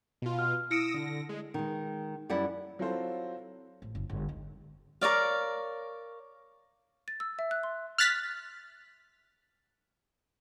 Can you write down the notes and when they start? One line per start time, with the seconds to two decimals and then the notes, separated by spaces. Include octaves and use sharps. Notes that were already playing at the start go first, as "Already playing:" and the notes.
0.22 B2 F4
0.39 F6
0.71 E4 D#6 E6 A#6 C#7 D7
0.93 D3 A#6
1.29 G#3
1.54 D#3 G#3
2.29 F#2 G3 E4 D5 F#5
2.79 F#3 C4 E4 F4 A4 C5
3.82 A1
3.95 F#1
4.09 G1
4.29 D#4
5.01 A#4 C#5 D5 F5
7.08 A6
7.20 E6
7.39 E5
7.51 F#6
7.63 C6
7.98 F6 F#6 A6 B6